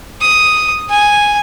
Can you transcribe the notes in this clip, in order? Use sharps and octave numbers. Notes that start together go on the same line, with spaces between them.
D#6
G#5